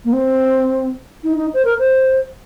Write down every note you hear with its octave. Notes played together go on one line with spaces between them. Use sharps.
A#3
C4
D#4
D#4
C5
A#4
C5